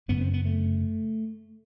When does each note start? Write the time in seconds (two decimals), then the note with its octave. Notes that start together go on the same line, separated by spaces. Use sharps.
0.08 G1 F#2 C#3 B3
0.21 C4
0.34 B3
0.45 A3